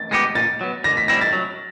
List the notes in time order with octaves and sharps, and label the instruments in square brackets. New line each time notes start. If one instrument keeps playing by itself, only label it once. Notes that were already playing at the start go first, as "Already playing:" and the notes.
Already playing: [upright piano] A6
[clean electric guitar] G#3 B3 E4 G4 [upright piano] A#6
[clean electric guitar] A#2 [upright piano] A6
[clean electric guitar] F#3 B3
[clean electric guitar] D3 [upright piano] A#6
[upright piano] B6
[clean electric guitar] G3 C4 E4 [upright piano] A#6
[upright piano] A6
[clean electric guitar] F#3